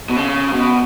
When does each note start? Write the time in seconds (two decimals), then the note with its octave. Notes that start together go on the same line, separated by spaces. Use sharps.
0.10 B2
0.16 C#3
0.53 B2